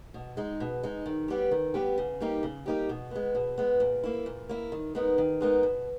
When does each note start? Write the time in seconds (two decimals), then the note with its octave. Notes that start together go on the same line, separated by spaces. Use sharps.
0.14 B2
0.37 G#3 D#4
0.60 B2
0.83 G#3 D#4
1.06 D#3
1.28 G3 B3 G4
1.51 D#3
1.74 G3 B3 G4
1.98 C#3
2.20 G3 A#3 D#4 G4
2.43 C#3
2.66 G3 A#3 D#4 G4
2.89 B2
3.11 G#3 B3
3.35 B2
3.58 G#3 B3
3.80 A#2
4.03 A#3 E4
4.26 A#2
4.49 A#3 E4
4.72 D#3
4.95 G#3 B3 D#4 A#4
5.18 D#3
5.41 G#3 B3 D#4 A#4
5.63 B2